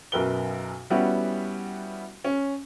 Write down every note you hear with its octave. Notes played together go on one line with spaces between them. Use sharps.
B1 F#2 A#4 B4 G7
G3 B3 C#4 E4 F#4
C#4